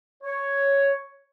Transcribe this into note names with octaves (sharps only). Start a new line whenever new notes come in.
C#5